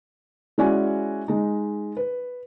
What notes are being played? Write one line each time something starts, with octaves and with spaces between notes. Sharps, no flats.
G#3 C#4 E4 F#4 D5 G#5
G#3 D#4
B4